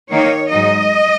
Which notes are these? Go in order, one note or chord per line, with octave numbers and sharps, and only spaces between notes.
D#3 A#3 D#4 C#5
G#2 F#3 D#4 D#5